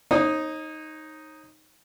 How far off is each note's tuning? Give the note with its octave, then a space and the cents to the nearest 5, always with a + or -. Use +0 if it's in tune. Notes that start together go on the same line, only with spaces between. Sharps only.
D#4 +0 C#5 -40 D#6 +0